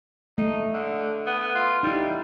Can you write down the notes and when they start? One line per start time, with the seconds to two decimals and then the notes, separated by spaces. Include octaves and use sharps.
0.38 A3 D#4
0.73 D3
1.27 B3
1.55 F4
1.83 G3 D#4 E4